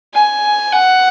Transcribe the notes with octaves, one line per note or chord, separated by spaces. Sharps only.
G#5
F#5